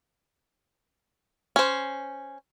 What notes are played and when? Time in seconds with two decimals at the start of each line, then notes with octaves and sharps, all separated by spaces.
1.56 C#4 C5